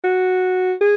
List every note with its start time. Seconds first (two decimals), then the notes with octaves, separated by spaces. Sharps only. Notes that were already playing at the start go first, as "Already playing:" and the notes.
0.04 F#4
0.81 G#4